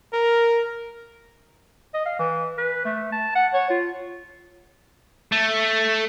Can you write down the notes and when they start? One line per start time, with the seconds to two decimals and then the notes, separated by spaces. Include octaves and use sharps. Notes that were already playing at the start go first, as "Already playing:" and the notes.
0.13 A#4
1.94 D#5
2.06 F5
2.19 E3
2.58 B4
2.85 A3
3.12 A5
3.35 F#5
3.53 C#5
3.70 F4
5.32 A3